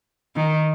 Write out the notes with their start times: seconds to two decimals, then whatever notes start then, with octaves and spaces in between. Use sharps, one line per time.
0.36 D#3